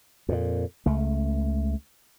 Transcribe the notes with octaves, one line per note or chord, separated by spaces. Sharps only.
F2 A#2
C#2 A3